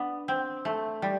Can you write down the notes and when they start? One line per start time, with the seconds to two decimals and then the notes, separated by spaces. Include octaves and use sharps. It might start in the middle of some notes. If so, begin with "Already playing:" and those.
Already playing: B3 D4
0.28 C4
0.65 A3
1.02 G3